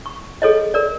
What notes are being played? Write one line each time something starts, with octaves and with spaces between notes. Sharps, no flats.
C#6
G#4 A4 C#5 D#5
A#4 D5